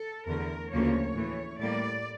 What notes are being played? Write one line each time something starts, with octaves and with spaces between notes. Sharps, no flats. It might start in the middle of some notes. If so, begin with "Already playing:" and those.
Already playing: A4
E2 D3 A3 A#4
D2 C#3 F3 A#3 C#5
A2 E3 A3
A2 G3 A#3 D5